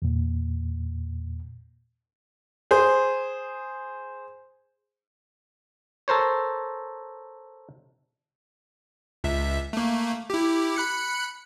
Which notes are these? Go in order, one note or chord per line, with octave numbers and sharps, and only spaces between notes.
E2 A#2
G#4 C5
A4 A#4 C5 C#5
C#2 E5
A3 A#3
E4 G4
B5 F#6 C#7